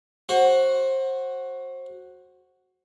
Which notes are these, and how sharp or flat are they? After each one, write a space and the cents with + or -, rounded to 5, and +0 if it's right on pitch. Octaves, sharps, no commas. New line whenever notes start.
F#4 +0 C5 +25